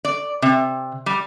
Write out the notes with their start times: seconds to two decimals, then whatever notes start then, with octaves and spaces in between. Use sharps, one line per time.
0.05 D5
0.42 C3
1.06 G3